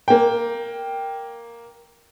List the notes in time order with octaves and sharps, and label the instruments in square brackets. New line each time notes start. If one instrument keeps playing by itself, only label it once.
[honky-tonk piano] A#3 G5